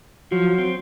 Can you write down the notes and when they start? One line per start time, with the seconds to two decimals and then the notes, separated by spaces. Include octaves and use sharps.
0.32 F3 F#3
0.58 C4